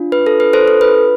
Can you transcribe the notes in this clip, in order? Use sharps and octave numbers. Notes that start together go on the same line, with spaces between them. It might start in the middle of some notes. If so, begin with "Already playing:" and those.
Already playing: D4 F4
B4
A4
B4
A4 C5
A4
B4